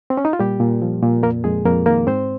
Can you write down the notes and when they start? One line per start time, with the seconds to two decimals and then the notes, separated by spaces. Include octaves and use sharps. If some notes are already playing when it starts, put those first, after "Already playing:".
0.10 C4
0.17 C#4
0.25 D#4
0.33 F4
0.39 A#2 G3 G4
0.60 A#2
0.82 F3
1.03 A#2
1.23 F2 A#3 A#4
1.44 F2 G#3 G#4
1.65 F2 A#3 A#4
1.86 D#3 A#3 A#4
2.07 G#2 C4 C5